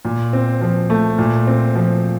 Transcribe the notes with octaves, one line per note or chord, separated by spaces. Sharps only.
A#2
C4
F3
A3
A#2
C4
F3